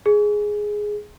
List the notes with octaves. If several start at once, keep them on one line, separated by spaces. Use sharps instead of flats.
G#4